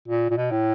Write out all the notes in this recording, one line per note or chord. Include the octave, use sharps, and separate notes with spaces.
A#2
A#2
B2
A2